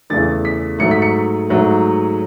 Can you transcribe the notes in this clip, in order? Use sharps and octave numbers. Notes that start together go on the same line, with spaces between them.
E2 C#3 E3 A3 A6
B6
G#2 F#3 A3 C#7
B6
C#7
G#2 F#3 A3